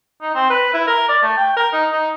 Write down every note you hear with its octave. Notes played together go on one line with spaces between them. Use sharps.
D#4
C4
B4
E4
A#4
D5
A3
G5
A#4
D#4
D#4